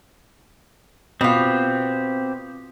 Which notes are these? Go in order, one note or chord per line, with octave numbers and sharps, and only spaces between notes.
B2 C4 F4 G4